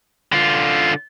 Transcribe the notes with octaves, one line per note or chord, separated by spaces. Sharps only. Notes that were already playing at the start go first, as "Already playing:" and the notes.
D3 F4